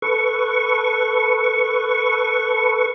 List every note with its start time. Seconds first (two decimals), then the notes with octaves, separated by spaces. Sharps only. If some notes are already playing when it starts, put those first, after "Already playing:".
0.02 A4 B4 C#6